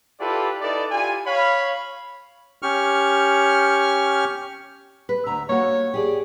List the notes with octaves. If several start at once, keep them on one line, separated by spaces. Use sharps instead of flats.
E4 F4 G4 A4 B4 D5
D#4 E4 A4 B4 D5
E4 F4 G4 G#5
C#5 F5 B5
C#4 G4 C#6 F6
B4
D2 E5 A#5
A#3 F#4 C#5
G4 G#4 D5